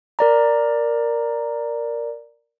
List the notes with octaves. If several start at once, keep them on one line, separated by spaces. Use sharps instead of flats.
A#4 D5 A#5